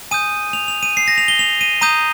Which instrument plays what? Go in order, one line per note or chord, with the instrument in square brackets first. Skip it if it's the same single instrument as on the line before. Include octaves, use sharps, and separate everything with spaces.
[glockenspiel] G#5 D#6 G6 D#7
F7
F7
D#7
C7
A#6
F7
G7
F7
D#7
A#5 D#6 G6 D#7